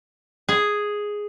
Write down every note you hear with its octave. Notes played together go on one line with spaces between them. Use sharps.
G#4